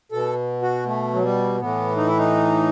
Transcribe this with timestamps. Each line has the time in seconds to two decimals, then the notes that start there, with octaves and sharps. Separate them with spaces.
0.12 B2 A4
0.62 F#4
0.86 A3
1.14 F#3
1.23 G3
1.60 A2 E3 B3
1.97 D#4
2.07 E4
2.18 D#4